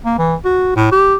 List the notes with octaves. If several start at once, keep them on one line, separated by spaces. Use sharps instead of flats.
A#3
E3
F#4
A2
G4